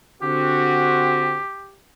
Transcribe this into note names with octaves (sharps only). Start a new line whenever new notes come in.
D3 C4 F#4 G4